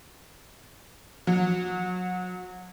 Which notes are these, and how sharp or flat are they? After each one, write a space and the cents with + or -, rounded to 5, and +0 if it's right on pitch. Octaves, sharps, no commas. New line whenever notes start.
F#3 -25